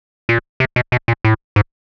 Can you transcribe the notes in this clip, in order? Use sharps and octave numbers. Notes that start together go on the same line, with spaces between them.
A#2
C3
B2
B2
A#2
A2
G#2